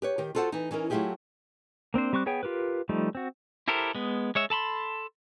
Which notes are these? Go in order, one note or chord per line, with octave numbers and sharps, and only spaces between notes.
G4 B4 C#5
D#3 G4
F4 F#4 A4 C5 F#5
E3 D#4
E3 C#4 D#4 A#4
F#3 A3 E4 F4 G4 G#4
A#3 C4 D4 C5
G3 C4 C#6 D6 F#6
B3 G#4 C#5 G5
F4 G4 A#4 B4
F3 G3 A3 D#4
C4 F#4
E4 G4 A4 A#4 C5
G#3 B3
G#3 C#5 E5
A4 A5 B5 C6